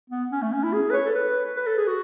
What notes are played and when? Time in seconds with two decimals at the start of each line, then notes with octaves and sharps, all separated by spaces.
0.10 B3
0.31 C#4
0.42 A3
0.53 C#4
0.63 E4
0.73 G#4
0.90 B4
0.94 C#5
1.05 A4
1.15 B4
1.57 B4
1.67 A4
1.78 G#4
1.88 F#4